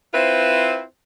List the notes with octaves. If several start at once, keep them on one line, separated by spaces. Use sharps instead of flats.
C4 E4 F4 B4 C5